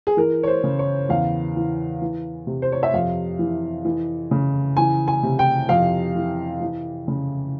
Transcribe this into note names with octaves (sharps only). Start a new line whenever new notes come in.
G#4
E3 A#4
C#5
C5
C#3
C#5
E2 F5
E3
E3
C3
C5
C#5
E5
F2 F5
E3
E3
C#3
E3 G#5
G#5
C3
G5
F2 F5
E3
E3
C#3